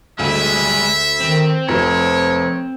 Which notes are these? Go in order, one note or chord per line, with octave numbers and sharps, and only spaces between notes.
D2 G3 G#3 E5
D#3 C4
F1 F3 C#5